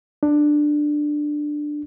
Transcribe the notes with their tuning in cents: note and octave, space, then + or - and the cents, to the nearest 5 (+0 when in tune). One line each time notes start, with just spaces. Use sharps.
D4 +10